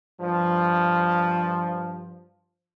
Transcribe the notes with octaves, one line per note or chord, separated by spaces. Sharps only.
G2 F3